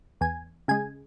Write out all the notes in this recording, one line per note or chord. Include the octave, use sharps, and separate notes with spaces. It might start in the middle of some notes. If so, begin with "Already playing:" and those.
E2 G#5
C#3 G#3 G#5